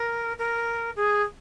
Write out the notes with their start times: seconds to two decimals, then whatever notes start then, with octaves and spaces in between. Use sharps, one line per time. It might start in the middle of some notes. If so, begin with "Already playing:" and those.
Already playing: A#4
0.38 A#4
0.96 G#4